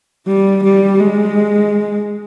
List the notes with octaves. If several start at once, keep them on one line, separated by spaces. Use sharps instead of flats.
G3
G3
G#3